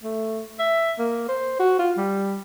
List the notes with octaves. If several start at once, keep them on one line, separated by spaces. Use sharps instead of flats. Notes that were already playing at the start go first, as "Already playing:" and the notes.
A3
E5
A#3
C5
F#4
F4
G3